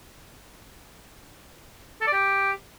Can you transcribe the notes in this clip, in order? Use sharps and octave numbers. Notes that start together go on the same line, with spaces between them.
A4
D5
G4